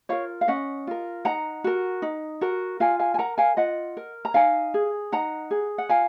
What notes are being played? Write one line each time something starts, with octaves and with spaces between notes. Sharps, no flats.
F4 A#4 C#5 F5
F5
C#4 D#5 F#5
F4 A#4
D#4 F#5 A#5
F#4 A#4
D#4
F#4 A#4
F4 F5 G#5
F5 G#5
G#5
A#4 F#5 A#5
F5 G#5
F4 D#5 F#5
A#4
A#5
D#4 F5 G#5
G#4
D#4 F#5 A#5
G#4
F#5
F4 F5 G#5